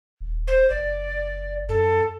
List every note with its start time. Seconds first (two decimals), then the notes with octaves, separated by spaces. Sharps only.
0.20 D#1
0.47 C5
0.70 F#1 D5
1.69 F#2 A4